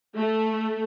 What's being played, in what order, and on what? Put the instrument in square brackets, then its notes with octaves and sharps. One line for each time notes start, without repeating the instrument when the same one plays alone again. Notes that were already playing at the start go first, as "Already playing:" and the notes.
[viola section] A3